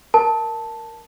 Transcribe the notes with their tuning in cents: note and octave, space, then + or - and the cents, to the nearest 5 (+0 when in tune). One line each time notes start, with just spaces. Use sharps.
A#4 +0 A5 +0